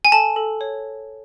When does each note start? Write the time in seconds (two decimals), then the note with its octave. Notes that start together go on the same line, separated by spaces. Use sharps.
0.05 G#5
0.12 A4 A5
0.36 A4
0.61 C#5